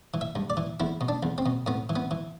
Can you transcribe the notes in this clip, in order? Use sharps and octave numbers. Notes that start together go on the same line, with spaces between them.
E3
E5
G2
D5
E3
E2 E4
B2
D4
E2
C4
B2
A2 B3
E3
B3
E3